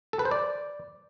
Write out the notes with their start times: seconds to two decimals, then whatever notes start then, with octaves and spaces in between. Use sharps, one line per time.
0.13 A4
0.19 B4
0.25 C5
0.31 D5